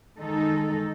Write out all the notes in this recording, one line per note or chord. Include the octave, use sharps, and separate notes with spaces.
D#3 G#3 D#4 A4